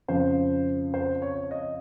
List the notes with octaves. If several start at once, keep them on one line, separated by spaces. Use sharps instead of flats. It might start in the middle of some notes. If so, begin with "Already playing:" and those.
F2 C#3 F3 C5
C5
C#5
D#5